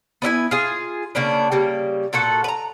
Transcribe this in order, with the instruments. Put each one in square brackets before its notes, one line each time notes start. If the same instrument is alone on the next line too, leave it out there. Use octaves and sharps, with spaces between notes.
[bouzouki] B3 D4 E4 G#5
F4 G#4
C#3 A#3 B3 D4
C#3 G3 A#3
A#2 F#4 A4 F#5
B4 A#5